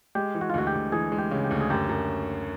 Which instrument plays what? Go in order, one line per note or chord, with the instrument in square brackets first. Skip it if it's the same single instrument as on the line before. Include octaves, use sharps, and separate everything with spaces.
[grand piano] G#3 [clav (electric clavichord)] G4
[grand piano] E3
[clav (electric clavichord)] F#4
F4
[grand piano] D2 [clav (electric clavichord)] F#4
[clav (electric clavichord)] G4
[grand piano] D2
[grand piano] E3 [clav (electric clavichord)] G#4
[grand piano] G#3
[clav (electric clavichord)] G4
[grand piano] C#3
[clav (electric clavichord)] G4
[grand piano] D2
[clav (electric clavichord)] G#4
[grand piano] F#2 [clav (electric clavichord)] G4
[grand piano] F#2